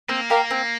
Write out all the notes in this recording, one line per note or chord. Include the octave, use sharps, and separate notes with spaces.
A#3 C4
G4 A#4 F5
C4